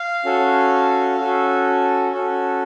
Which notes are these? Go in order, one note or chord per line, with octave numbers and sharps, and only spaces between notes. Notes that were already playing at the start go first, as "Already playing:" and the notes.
Already playing: F5
C#4 F#4 A4
C#4 F#4 A4
C#4 F#4 A4